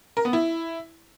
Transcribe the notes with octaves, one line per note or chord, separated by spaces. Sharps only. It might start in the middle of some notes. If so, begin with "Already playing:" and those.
A#4
B3
E4